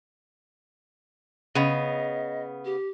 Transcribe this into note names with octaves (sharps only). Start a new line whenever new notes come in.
C#3 B3 D#5
G4